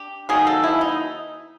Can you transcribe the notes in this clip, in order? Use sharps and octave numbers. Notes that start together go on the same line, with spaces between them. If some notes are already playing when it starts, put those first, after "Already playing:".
Already playing: D4 G4
D#3 F#3 A#3 D#4 G#4
A4
E4
D#4